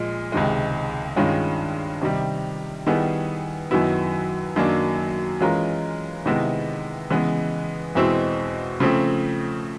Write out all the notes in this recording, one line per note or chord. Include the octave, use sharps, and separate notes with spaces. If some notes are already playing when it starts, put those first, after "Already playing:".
Already playing: A#2 F3 G#3
C#2 C3 D#3 G#3
G2 D#3 G#3 C#4 F4
C3 D#3 G3
D#3 G3 B3 E4 G#4
F#2 D#3 F#3 B3 E4
F#2 D#3 F#3 A#3 D4
E3 G#3 C#4 F4 A#4
C3 D#3 G#3 B3 E4
C#3 E3 G#3 B3
E2 B2 G#3 C4 E4
C#3 F3 A3 C4